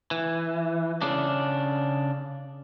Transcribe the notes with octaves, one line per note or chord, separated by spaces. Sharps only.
E3
C#3 D4